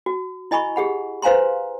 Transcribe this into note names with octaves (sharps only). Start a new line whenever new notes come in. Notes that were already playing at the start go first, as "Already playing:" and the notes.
F#4
E4 D#5 G#5 B5 C#6
G4 G#4 F#5 B5
B4 C5 F5 G#5 A#5 C6